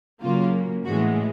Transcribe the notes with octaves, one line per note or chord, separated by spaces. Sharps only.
C#3 F#3 A#3 F4
A2 E3 G#3 F#4